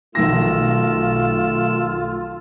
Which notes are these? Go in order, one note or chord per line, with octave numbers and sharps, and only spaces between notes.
B1 D#3 A3 F4 E6 A#6